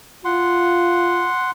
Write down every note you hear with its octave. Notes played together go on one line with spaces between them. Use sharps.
F4 F#5 C6